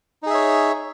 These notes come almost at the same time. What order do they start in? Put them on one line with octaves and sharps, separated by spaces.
D#4 G#4 E5 C#5